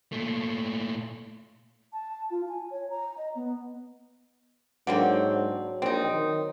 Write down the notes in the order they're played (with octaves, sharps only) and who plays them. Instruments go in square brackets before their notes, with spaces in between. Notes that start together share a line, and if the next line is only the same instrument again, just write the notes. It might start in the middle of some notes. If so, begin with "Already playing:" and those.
[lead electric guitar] A#2 A3
[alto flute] A5
F4
G#5
C#5
A#5
D#5
B3
[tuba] G#2 [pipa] D3 A#3 C4 [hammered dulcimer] F#3
[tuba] A#1 [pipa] C4 D#4
[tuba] D#3